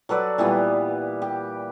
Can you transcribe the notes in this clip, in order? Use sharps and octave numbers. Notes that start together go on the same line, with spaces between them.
F#3 A4 B4 D5
A#2 E3 G3 B3
G4